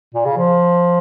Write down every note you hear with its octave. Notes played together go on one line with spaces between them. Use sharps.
A#2
C#3
F3